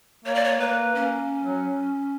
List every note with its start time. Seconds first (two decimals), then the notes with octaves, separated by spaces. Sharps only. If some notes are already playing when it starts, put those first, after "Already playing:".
0.25 A#3 C#5
0.35 D5
0.45 C#5
0.60 A#3 B4
0.95 A#3 C#4
1.43 F#3